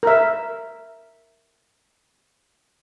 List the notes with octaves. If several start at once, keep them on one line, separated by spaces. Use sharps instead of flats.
A#4 E5